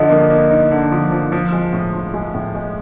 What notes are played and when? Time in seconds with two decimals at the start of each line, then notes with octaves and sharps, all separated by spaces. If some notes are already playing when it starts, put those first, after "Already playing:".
Already playing: D3 F3 D#5
0.10 A#3
0.30 A#3
0.51 D#4
0.71 D3
0.92 F3
1.12 F3
1.32 F3
1.52 G#3
1.73 A2
1.93 F3
2.14 G#3
2.35 A2
2.55 G#3